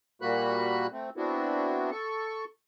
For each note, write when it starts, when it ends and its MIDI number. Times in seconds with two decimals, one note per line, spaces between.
0.22 0.87 46
0.22 0.87 55
0.22 0.87 58
0.22 0.87 66
0.22 0.87 83
0.22 0.87 90
0.92 1.10 57
0.92 1.10 60
1.17 1.90 59
1.17 1.90 60
1.17 1.90 62
1.17 1.90 64
1.17 1.90 66
1.91 2.45 69
1.91 2.45 85